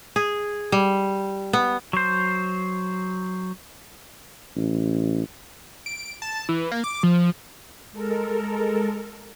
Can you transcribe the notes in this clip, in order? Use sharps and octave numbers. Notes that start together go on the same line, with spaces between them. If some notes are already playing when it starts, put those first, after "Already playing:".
G#4
G3
B3
F#3 C5
A1
D7
A5
E3
A#3
D6
F3
G#3 A4 A#4